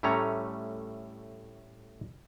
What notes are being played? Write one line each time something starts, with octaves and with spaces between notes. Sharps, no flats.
A2 G3 A3 C#4 C#5 A#5